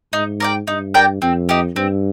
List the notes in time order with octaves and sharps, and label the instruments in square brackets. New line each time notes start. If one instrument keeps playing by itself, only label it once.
[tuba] G#2 [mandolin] D#4
[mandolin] A#4 D5 G5
[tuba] G2 [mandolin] D#4
[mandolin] A#4 D5 G5
[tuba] F2 [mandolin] C4
[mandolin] D#4 G4
[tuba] G2 [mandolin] C4